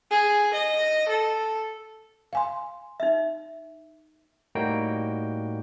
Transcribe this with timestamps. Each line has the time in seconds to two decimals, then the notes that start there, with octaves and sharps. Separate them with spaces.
0.11 G#4
0.54 D#5
1.08 A4
2.33 F5 G#5 C6
3.00 D#4 E5
4.55 A2 G3 A#3 D#4 F#4 G5